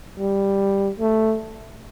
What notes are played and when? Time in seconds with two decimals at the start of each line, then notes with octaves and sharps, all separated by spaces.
0.19 G3
1.00 A3